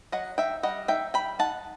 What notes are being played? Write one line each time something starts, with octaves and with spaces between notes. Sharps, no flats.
F#3 D#5 F#5
D#4 E5 G5
G3 D#5 F#5
D#4 E5 G5
G3 G5 B5
D#4 F#5 A5